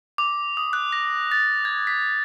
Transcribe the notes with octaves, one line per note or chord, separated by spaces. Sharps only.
D6
D#6
F#6
A#6
A6
G#6
B6